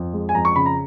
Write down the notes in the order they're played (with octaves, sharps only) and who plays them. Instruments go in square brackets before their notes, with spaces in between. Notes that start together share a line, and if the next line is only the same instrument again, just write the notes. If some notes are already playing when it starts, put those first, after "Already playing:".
Already playing: [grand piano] F2
G#3
G#5
F2 A#5
C#6
C#3 B5
A#5